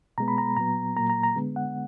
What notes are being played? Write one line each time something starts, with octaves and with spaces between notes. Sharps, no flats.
B2 G#3 B3 A#5
B5
A#5
A#2 F#3 B3 A#5
A#2 F#3 A#3 A#5
A#5
A#5
D3 G#3 B3
F#5